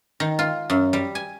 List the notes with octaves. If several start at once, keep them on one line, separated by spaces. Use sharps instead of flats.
D#3
F4
F#2
G3
G#5